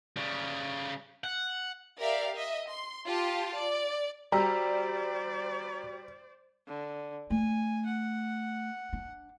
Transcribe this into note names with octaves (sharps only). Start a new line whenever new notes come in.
C#3 G3
F#5
G4 A#4 D5 E5 F5
D#5 E5
C6
F4 G4 A5
D5
G3 F#4 G4 C5 D5 A#5 E6
D3
A3 G#5
F#5
D4